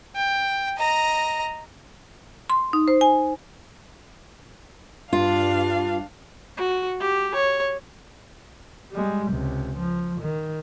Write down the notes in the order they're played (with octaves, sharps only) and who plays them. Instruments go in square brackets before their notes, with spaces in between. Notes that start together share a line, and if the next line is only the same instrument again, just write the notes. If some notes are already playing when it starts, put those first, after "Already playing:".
[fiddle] G5
D#5 A#5
[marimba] C6
D#4
C5
G#5
[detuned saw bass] G2 [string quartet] D4 F5 [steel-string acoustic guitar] F4
[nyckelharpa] F#4
G4
C#5
[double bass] G3 G#3
C#2 C3
F3
D#3